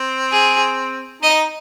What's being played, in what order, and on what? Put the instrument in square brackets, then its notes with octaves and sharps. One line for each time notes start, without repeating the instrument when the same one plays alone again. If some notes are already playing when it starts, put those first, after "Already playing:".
Already playing: [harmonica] C4
[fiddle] G#4
[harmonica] D#4 [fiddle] D#5